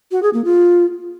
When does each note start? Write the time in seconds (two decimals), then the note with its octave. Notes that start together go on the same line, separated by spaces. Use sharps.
0.11 F#4
0.22 G#4
0.33 A#3
0.44 F4